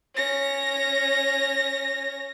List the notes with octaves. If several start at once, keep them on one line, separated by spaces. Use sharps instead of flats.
C#4 A#6